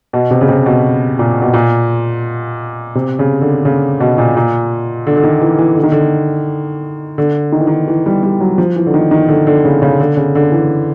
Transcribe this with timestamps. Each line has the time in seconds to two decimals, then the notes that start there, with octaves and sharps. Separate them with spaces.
0.13 B2
0.31 C3
0.41 C#3
0.48 C3
0.66 B2
1.19 A#2
1.42 B2
1.53 A#2
2.95 C3
3.19 C#3
3.41 D3
3.65 C#3
4.00 B2
4.18 A#2
4.36 A#2
5.07 D3
5.17 D3
5.24 D#3
5.42 E3
5.59 E3
5.76 D3
5.83 D#3
5.92 D3
7.18 D3
7.52 D#3
7.60 E3
7.67 D#3
7.88 E3
8.06 G3
8.23 G3
8.40 F#3
8.58 F3
8.76 E3
8.86 D3
8.94 D#3
9.11 D#3
9.28 D3
9.47 D3
9.65 C#3
9.82 C#3
10.00 D3
10.17 C#3
10.35 D3
10.52 E3